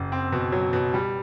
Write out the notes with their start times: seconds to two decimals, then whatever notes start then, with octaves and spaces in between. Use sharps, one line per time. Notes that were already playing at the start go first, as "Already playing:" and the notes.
Already playing: F#1
0.12 C4
0.32 B2
0.52 F#3
0.73 B2
0.94 G3